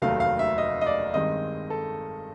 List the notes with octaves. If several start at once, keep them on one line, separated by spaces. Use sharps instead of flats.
F1 D#2 D#3 F#3 A3 F5
F5
E5
D#5
D#5
D5
G2 D#3 G#3 C4 D#5
A4